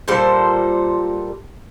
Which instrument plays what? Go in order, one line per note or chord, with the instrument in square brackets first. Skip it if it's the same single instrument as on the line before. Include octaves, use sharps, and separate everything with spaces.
[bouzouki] A#2 G3 A4 C5